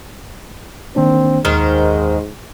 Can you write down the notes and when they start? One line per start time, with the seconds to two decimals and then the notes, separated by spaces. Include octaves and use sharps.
0.96 D#3 A#3 C4 D4
1.45 D#2 G#2 D#3 G#3 C5 F6